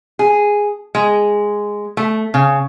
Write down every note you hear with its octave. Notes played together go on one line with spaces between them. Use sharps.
G#4
G#3
A3
C#3